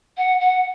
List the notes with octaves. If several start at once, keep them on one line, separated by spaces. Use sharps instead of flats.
F#5
F#5